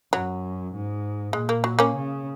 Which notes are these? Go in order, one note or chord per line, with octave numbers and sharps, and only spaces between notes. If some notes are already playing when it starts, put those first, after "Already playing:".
F#2 F#3
G#2
A#2 G#3
A#3
F#3
A#3 C#4
C#3